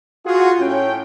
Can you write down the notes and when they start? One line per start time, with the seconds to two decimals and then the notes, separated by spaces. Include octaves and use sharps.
0.26 F4 F#4 G#4
0.59 A2 C#4 G5